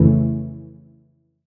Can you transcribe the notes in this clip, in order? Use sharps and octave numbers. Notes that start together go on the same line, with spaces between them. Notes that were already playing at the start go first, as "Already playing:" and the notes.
Already playing: F2 C#3 E3 A3